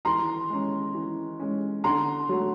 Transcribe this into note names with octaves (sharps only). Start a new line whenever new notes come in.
E3 A#5 C6
G#3 C#4
E3
G#3 C#4
D3 A#5 C6
F#3 A3